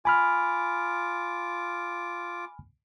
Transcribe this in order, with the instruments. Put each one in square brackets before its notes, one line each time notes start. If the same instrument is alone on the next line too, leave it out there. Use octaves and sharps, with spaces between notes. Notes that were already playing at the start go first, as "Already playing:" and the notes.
[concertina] F4 D6 [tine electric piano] G#5 B5 F6